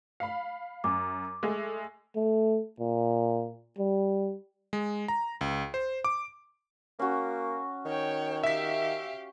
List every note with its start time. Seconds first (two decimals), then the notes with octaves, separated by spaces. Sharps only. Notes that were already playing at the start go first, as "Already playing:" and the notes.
0.20 F5 B5
0.84 F#2 D6
1.43 G#3 A3
2.16 A3
2.80 A#2
3.78 G3
4.73 G#3
5.08 A#5
5.41 C#2
5.74 C5
6.04 D6
6.99 A#3 C#4 F#4
7.86 D#3 C#5 G5
8.43 G4 E5 F5 B6